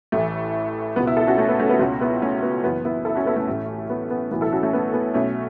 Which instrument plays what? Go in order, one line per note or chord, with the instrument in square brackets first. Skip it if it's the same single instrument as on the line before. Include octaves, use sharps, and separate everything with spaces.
[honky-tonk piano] A1 A2 E3 A3
C#2 B2 B3
B3 E4
E4 A4
C#4 F#4
A3 C#4
B3
A3 C#4
B3 E4
C#2 B2 C#4 F#4
B3 E4
A3 C#4
B3
F#1 F#2 E3 B3
B3 E4
E4 A4
C#4 F#4
B3 E4
A3 C#4
A1 A2 E3
B3
B3
B1 A2 E3 B3
E4 A4
C#4 F#4
A3 C#4
B3
B3
B1 B2 A3 C#4